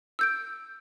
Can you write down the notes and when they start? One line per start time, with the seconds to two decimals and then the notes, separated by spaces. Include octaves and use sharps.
0.19 E6 G6 D7